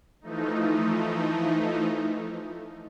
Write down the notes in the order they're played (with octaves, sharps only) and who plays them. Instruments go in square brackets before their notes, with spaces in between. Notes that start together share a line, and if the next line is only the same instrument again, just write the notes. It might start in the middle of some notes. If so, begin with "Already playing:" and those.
[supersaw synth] E3 F3 A3 D#4